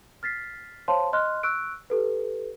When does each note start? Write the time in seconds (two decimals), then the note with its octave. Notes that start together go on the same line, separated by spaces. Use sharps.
0.23 F6 A6 B6 C7
0.88 C5 C#5 F5 A5 C6
1.13 D#5 C6 F6 F#6
1.43 C#6 E6 F#6 D7
1.90 G4 A4 B4